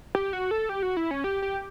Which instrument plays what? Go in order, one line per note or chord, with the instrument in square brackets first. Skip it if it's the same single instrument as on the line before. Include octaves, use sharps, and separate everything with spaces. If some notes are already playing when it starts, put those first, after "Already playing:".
[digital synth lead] G4
F#4
A4
G4
F#4
E4
C#4
G4
G4